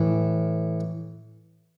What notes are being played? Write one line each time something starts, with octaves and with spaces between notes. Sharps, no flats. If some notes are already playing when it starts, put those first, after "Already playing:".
Already playing: A2 E3